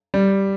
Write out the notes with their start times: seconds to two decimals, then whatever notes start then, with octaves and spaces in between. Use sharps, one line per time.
0.14 G3